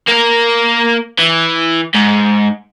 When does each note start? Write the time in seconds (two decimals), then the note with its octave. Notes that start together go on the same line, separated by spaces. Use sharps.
0.08 A#3 A#4
1.19 E3
1.95 G#2